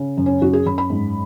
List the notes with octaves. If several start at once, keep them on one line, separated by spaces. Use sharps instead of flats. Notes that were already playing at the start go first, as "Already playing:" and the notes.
Already playing: C#3
F#2
C#4
F#2 F#4
G#4
F#2 B5
B5
G#2